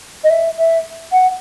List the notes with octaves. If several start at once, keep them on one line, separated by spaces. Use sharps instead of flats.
D#5
E5
E5
F#5